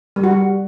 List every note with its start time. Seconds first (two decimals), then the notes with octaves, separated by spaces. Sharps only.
0.16 G3
0.24 F#4
0.31 G3